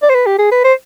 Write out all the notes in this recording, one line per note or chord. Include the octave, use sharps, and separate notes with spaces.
D5
C5
B4
G4
G#4
B4
C5